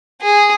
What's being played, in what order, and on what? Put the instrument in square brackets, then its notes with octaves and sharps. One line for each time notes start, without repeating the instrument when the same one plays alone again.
[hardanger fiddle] G#4